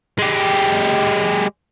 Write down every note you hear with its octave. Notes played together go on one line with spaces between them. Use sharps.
G#3 G4